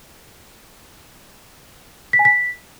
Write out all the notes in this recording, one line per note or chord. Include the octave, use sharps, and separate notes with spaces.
B6
G#5
B6